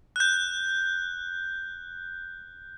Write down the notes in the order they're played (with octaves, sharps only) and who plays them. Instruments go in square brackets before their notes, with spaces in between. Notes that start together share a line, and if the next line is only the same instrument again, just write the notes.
[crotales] F#6 G6